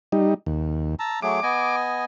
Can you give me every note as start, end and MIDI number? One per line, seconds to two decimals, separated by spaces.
0.12 0.34 55
0.12 0.34 63
0.46 0.95 39
0.99 1.20 81
0.99 1.20 82
0.99 1.20 88
1.23 1.40 54
1.23 1.40 57
1.23 1.40 68
1.23 1.76 86
1.43 2.05 59
1.43 2.05 75
1.43 2.05 80